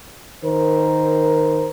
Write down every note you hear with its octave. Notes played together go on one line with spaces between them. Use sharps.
D#3 A#4 C5